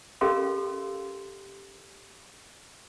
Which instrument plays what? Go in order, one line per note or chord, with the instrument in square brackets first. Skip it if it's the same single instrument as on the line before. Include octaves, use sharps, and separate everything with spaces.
[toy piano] C#4 G4 A4 A#4 F5 C6